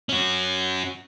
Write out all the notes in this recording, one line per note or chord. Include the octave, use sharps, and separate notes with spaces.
C#4 F#4